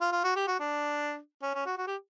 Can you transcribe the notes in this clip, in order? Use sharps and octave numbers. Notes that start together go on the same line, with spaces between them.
F4
F4
F#4
G4
F#4
D4
C#4
C#4
F#4
F#4
G4